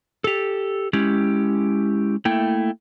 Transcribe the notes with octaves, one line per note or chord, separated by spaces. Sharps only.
G4 A4
G#3 C#4 E4 G4
A3 A#3 E4 G5